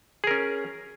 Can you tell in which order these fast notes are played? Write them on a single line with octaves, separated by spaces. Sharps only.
G#4 A#4 C#4